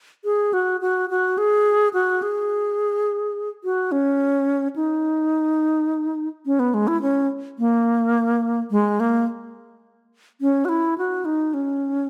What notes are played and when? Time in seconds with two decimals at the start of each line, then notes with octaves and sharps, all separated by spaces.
0.25 G#4
0.53 F#4
0.81 F#4
1.10 F#4
1.38 G#4
1.94 F#4
2.22 G#4
3.64 F#4
3.92 C#4
4.76 D#4
6.46 C#4
6.59 B3
6.74 G#3
6.88 E4
7.02 C#4
7.59 A#3
8.71 G#3
9.00 A#3
10.41 C#4
10.65 F#4
10.69 E4
10.98 F#4
11.25 D#4
11.54 C#4